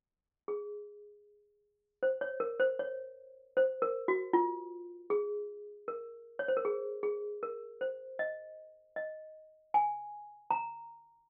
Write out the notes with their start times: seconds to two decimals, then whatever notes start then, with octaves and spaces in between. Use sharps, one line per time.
0.48 G#4
2.03 C5
2.21 C#5
2.40 A#4
2.60 C5
2.79 C#5
3.57 C5
3.82 A#4
4.08 F#4
4.33 F4
5.10 G#4
5.88 A#4
6.39 C#5
6.48 C5
6.57 A#4
6.65 G#4
7.03 G#4
7.43 A#4
7.81 C5
8.19 D#5
8.96 D#5
9.74 G#5
10.51 A#5